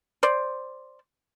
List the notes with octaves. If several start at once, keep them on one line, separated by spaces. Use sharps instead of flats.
C5 D5